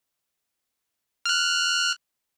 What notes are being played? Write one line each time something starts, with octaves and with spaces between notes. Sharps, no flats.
F6 F#6